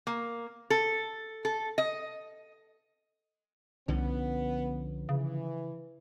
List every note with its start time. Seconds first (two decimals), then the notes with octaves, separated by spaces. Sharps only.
0.07 A#3
0.70 A4
1.45 A4
1.78 D#5
3.88 C2 D3 F3 B3 C#4
5.09 C#3 E3